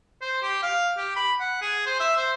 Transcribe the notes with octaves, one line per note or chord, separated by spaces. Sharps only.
C5
G4
F5
G4
B5
F#5
G#4
C5
E5
C5